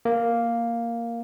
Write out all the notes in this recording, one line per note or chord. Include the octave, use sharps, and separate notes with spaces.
A#3